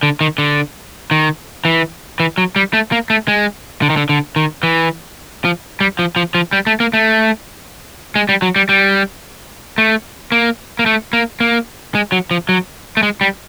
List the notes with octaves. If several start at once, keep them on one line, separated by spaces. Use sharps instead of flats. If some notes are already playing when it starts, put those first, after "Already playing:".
D3
D#3
D3
D#3
E3
E3
F#3
G3
A3
A#3
A3
G#3
D3
D#3
D3
D3
D#3
E3
F3
G3
F3
F3
F3
G3
A3
A#3
A3
G#3
G3
F#3
G3
G3
A3
A#3
A#3
A3
A#3
A#3
G#3
F#3
F3
F#3
A3
G#3
G3